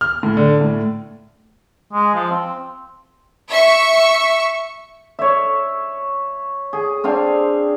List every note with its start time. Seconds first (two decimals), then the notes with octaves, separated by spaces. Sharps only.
0.01 F6
0.23 A2
0.37 D3
0.61 A2
1.93 G#3
2.15 F3
2.31 C4
3.51 E5 C#6
5.19 C#5 E5
6.73 G#4
7.04 C4 D4 F5 G#5